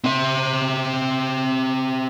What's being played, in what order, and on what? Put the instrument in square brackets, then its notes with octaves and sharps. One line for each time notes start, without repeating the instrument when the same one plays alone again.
[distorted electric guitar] C4 E5